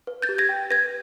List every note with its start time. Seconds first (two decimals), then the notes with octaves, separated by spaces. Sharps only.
0.07 B4
0.22 G6 A6
0.29 G4
0.38 G#6 A#6
0.49 G5
0.70 B4 G#6 A#6